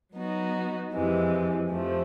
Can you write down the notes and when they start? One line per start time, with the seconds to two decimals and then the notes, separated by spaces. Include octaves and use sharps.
0.15 F#3 B3 D#4 F#4
0.93 F2 C3 E3 G#3
1.70 F2 C3 F3 A3